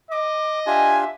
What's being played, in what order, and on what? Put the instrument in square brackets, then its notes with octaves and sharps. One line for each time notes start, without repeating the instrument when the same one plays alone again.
[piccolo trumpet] D#5 [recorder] D6
[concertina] D4 F4 G4 [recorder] E5 [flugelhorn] G#5